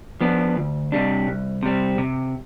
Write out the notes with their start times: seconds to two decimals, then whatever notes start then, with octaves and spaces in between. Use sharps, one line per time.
0.21 F3 B3 D4
0.56 D2
0.92 C3 G3 D4
1.27 C2
1.63 C3 G3 C4
1.98 C3